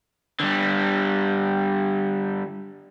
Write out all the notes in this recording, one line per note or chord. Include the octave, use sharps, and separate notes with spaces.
D3 G3